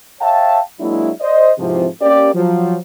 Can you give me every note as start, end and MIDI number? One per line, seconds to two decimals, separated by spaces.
0.20 0.59 73
0.20 0.59 76
0.20 0.59 77
0.20 0.59 79
0.20 0.59 81
0.80 1.10 54
0.80 1.10 56
0.80 1.10 58
0.80 1.10 62
0.80 1.10 64
1.20 1.51 72
1.20 1.51 74
1.20 1.51 75
1.58 1.86 44
1.58 1.86 48
1.58 1.86 52
1.58 1.86 53
2.01 2.31 58
2.01 2.31 61
2.01 2.31 67
2.01 2.31 74
2.34 2.75 53
2.34 2.75 54